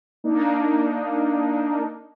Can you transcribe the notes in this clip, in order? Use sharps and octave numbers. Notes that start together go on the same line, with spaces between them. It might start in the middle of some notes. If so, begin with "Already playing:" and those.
A#3 D4 D#4